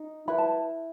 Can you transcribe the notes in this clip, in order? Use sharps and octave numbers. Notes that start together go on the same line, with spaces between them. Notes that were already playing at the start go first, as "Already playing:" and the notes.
Already playing: D#4
E4 B4 B5
A5